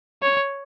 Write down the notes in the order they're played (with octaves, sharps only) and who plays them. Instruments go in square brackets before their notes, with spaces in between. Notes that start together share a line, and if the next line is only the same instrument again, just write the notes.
[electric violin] C#5